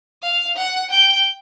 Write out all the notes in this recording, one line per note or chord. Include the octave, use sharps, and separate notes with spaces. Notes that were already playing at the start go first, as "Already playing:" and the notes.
F5
F#5
G5